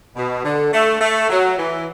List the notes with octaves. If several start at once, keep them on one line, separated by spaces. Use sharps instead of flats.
B2
D3
A3
A3
F#3
E3